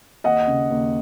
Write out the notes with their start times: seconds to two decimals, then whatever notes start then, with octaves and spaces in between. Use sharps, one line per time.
0.24 D#2 D#5 F#5
0.47 C#3
0.71 D#2